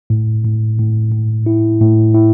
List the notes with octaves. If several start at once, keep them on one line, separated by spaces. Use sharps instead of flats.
A2
A2
A2
A2
E4
A2
E4